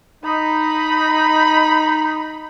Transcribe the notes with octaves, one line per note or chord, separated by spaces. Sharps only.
D#4 B5